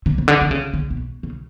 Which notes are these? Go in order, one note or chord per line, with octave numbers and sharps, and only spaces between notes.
D3
C#3
D3
D3
C#3
D3
B2
C#3